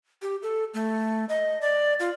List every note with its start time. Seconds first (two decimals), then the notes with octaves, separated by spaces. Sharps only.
0.22 G4
0.43 A4
0.74 A3
1.29 D#5
1.61 D5
2.00 F4